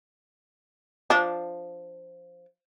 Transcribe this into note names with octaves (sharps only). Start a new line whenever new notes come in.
F3 D4